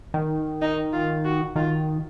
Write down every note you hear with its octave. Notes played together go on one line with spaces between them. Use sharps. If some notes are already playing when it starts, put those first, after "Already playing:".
D#3
D#4
F4
F#4
D#3 F4